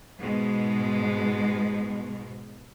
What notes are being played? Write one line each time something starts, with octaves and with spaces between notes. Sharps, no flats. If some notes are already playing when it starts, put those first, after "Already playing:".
G#2 B2 G#3